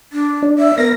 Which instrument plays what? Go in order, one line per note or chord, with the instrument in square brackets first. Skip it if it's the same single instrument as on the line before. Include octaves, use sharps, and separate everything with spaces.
[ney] D4
[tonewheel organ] D4
[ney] E5
[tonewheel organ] B3 A#6 [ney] A#4